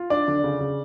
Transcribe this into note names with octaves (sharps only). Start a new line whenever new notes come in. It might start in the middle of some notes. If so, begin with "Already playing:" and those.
Already playing: F4
D4 D5
D3
C#3
C#3